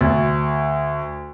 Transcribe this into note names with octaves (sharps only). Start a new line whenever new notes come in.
D2